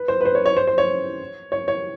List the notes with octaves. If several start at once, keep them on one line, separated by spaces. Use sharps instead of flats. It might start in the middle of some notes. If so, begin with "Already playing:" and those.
Already playing: B4
C5
B4
C5
C#5
C#5
C5
C5
C#5
C#5
C#5